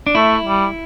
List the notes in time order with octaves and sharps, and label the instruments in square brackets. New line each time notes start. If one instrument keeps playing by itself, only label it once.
[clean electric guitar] D4
[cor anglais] A3 [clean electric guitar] E4
[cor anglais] G3